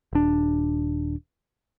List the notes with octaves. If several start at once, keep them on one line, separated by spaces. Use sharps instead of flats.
D#1 D4